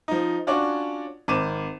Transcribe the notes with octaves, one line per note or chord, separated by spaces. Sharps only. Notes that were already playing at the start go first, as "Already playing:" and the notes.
F3 D#4
C#4 D4 F4 F#4 C#5 D5
G#1 C4 D6 D#7 E7